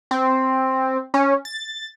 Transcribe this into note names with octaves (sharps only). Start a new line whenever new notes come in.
C4
C#4
A6